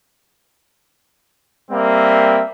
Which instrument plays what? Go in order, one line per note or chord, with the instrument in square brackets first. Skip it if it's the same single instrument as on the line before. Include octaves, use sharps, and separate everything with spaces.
[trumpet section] G3 A#3 C4 E5